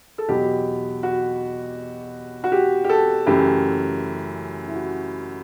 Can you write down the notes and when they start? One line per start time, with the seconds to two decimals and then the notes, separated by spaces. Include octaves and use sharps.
0.18 A4
0.28 E2 B2 F#3 G4
1.03 F#4
2.44 F#4
2.52 G4
2.84 G4
2.89 A4
3.27 F#2 C#3 E3 A3 G4
4.68 E4
4.75 F#4